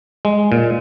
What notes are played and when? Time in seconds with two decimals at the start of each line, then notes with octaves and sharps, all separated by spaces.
0.25 G#3
0.52 A#2